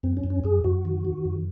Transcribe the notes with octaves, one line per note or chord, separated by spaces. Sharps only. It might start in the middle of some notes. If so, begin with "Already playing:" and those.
F#2 C4
C#4
F#2
C#4
F#2 G#4
F#2 F#4
D#3
D#3
F#2